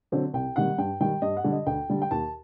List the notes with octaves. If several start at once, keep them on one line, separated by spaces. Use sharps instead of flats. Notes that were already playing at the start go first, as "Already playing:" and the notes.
D3 F#3 C4
C2 G5
C3 D#3 G3 F#5
G2 G5
D#3 G3 G5
G2 D#5
F#5
D3 G3
D#5
D2 G5
D3 G3
G5
D#2 A5